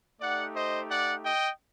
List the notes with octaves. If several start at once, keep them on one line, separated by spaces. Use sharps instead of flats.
A3 D#4 G4 D5 F#5
C5 D#5
D5 F#5
D#5 G5